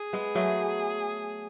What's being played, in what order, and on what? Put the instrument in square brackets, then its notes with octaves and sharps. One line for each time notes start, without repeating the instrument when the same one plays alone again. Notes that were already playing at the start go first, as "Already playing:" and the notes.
Already playing: [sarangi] G#4
[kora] G#3 B3
F#3 A3